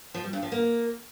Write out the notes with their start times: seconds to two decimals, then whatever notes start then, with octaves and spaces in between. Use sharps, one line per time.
0.14 F3
0.24 G3
0.33 G2
0.42 F3
0.52 A#3